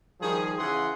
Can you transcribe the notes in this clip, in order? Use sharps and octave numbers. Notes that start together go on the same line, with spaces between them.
D#3 F3 G3 G#4
C#3 E3 E4 G#4 F#5 C6